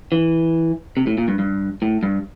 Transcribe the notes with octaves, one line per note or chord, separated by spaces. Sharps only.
E3
C3
A2
A#2
G2
G2
A2
G2